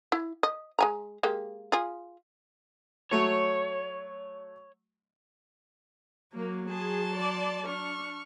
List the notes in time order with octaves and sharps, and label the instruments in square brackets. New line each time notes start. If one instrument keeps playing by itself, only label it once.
[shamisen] E4
D#5
G#3 G#5 A#5
G#3 A#3 G4
F4 G#4
[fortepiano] F#3 A3 [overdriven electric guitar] C#5
[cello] F#3 [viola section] A#3
[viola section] G#4 [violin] A5 C6
[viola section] D5
[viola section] D4 [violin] C#6 F6